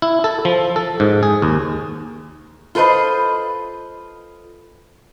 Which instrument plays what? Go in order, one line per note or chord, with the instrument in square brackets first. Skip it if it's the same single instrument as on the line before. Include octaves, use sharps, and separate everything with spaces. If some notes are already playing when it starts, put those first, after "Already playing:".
[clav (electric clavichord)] E4
A4
F3
A4
G#2
G#4
D#2
[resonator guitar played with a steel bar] F4 A4 B4 C5 D#5